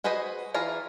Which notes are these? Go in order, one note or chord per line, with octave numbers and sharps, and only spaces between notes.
F#4 G#4 B4 C5 D#5
E3 F4 G#4 A#5